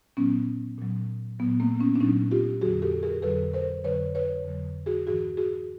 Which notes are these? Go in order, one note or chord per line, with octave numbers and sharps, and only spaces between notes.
A#2 F#3 B3 C#4
A#2 F#3
A#2 F#3 B3
A#3 C4
B3 C#4
D4
A#2 F#3 C#4 D#4
F4 G4
F2 D3 F#3 F#4 G#4
G4 A4
G#4 A#4
F2 D3 F#3 A4 B4
A#4 C5
F2 D3 F#3 B4 C#5
B4 C#5
F2 D3 F#3
F#4 G#4
G#2 E3 F#4 G#4
F#4 G#4